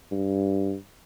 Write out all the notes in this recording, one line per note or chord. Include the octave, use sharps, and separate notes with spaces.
G2